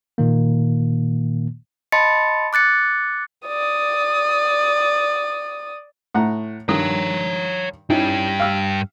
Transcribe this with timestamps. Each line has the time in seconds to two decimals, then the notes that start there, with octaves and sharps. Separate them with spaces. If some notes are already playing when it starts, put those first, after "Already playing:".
0.18 A#2 D#3 A#3
1.92 D#5 A5 B5 C6 A6 C#7
2.53 D6 F#6 A6 C#7
3.47 D5 D#6
6.15 A2 F#5 A#5
6.69 G2 D#3 C#5 A#5 D#6
7.90 G2 C#4 D#4 E4 G4
8.40 F5 E6